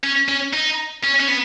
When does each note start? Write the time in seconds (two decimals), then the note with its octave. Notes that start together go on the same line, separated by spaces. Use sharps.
0.03 C#4
0.29 C#4
0.54 D#4
1.03 C#4
1.20 C#4
1.28 B3